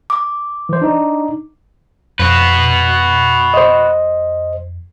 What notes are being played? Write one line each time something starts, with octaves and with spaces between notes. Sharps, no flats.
D6
E3 C5
D4 D#4
F2 F#4 B4
C5 D#5